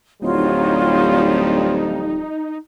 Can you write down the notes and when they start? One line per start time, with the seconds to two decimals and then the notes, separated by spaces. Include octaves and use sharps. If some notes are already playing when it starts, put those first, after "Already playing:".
0.22 D1 F2 F3 G3 D#4 F4 F#4 C#5